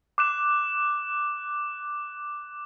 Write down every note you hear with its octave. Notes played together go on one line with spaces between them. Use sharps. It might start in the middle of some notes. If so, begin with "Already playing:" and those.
D6 F#6 E7